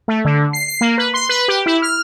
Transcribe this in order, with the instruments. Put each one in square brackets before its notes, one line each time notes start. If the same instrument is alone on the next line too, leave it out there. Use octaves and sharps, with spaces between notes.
[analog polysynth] A3
D3
C7
C7
A#3
B4
C6
B4
G4
E4
F6